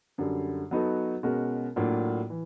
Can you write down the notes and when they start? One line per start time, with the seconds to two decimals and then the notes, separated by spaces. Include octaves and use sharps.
0.18 F#2 D3 G3
0.71 F#3 B3 D#4 F#4 A4
1.23 B2 G#3 C#4 F#4 A#4
1.76 A2 F#3 A#3 D4 F4
2.30 E3